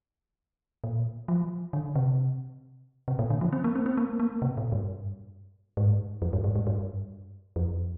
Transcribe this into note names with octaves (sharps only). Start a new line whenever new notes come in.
A#2
F3
D3
C3
C3
A#2
D3
F3
C4
A#3
C4
C4
A#3
A#3
C3
A#2
G2
G#2
F2
G2
G#2
G#2
G2
F2